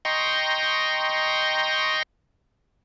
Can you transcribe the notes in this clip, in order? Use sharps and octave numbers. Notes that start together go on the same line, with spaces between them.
D#5 G5 A#5 C6 C#6